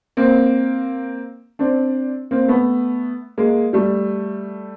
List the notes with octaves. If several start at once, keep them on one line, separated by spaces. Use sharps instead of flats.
A#3 C4
C4 D4
A#3 C4
A3 B3
G#3 A#3
G3 A3